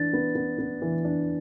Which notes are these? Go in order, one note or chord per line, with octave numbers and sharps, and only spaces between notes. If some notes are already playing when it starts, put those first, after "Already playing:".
Already playing: E3 D4 A6
B3
B3
B3
E3
D4